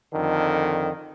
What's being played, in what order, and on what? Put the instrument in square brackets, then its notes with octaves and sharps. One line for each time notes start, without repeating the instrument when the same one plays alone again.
[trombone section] F2 D3 D#3